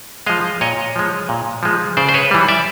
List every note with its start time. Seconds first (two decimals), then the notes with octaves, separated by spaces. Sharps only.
0.26 F3 G#3 D#5 F5
0.61 A#2 C#5 D#5
0.96 F3 G#3
1.29 A#2
1.63 F3 G#3
1.97 C#3 C5 D5
2.09 C5
2.14 B4 C#5
2.31 E3 G3
2.48 D5 E5